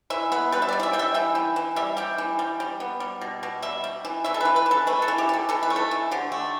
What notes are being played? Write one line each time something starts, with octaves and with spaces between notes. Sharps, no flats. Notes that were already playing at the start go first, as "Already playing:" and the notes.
E3 E5
B3 B4
G3 B4
E5
D5
E3
D5
E5
G3 G5
E5
E3 G5
E3
E3
G3 E5
G3 G5
E3
G3
G3
B3
G3
B2
B2
G3 E5
G3
E3
E3 E5
A4
E3 B4
B4
E3
A4
A3 B4
A4
E3
G4
E3 A4
E3 A4
B4
A3
A4
E3
D3 G4
A3